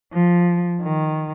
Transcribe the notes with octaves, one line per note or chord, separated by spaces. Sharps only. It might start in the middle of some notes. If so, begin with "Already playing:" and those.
F3
D#3